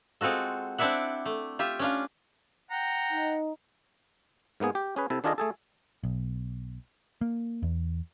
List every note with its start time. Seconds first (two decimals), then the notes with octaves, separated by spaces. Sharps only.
0.21 G#3 C4 F4 F#4 A4
0.78 C4 D4 E4 D5 E5 F#5
1.26 A3
1.59 F4 G4 E5
1.79 C#4 D4 F4
2.71 F#5 G5 A#5
3.12 D#4
4.60 G#2 A#3 B3 G#4
4.75 G4
4.96 C#4 G#4 B4
5.10 C3 E4 A4
5.24 D#3 D4 F4 G#4 A4 D#5
5.38 A3 G#4 A4
6.03 B1
7.21 A#3
7.63 E2